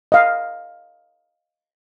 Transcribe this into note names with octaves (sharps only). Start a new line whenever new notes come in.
D#5 F5